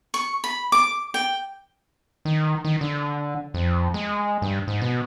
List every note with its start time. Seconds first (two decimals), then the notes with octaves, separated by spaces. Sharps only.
0.14 C#6
0.44 B5
0.72 D6
1.14 G5
2.25 D#3
2.65 D#3
2.81 D3
3.54 F2
3.94 G#3
4.42 G2
4.67 G#2
4.82 B2